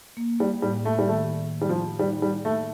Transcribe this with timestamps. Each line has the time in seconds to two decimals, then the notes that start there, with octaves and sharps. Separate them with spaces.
0.17 A#3
0.40 G3
0.62 A2 G3
0.85 A3
0.99 G3
1.08 D#3 A3
1.54 D#3
1.62 G3
1.69 F3
1.99 G3 D#4
2.22 G3
2.45 A3 A#3